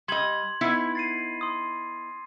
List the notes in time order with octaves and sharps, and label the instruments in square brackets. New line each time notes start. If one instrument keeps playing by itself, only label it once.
[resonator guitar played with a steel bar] G3 D#5 [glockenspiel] C6 G#6 F#7
[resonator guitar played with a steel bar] B3 D#4 E4 [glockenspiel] B6
[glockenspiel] A6 C7 D#7
C6 D#6